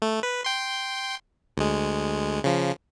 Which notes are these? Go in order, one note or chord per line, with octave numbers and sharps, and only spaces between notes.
A3
B4
G5 C6
D2 G#3
C#3 F3